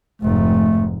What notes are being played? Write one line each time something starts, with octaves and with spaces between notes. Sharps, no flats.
F1 G#2 A3